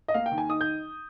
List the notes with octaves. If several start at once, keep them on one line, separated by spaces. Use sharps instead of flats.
D#5
A#3 F5
G5
D#3
G#5
D#4 D#6
G6